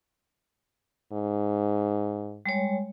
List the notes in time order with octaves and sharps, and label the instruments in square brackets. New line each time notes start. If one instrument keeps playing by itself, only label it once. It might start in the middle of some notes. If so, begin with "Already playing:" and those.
[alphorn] G#2
[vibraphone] G3 G#3 C#5